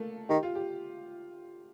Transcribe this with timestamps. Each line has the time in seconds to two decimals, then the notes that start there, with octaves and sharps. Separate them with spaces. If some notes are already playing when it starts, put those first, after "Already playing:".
Already playing: A3 A#3 A4 A#4
0.29 D#3 G4
0.43 F4
0.55 G4